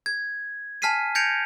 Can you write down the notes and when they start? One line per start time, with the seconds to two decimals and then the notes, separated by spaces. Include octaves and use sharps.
0.06 G#6
0.82 G#5 A5 F6 B6 C7 D#7
1.15 G6 G#6 A#6 C#7 D7 F7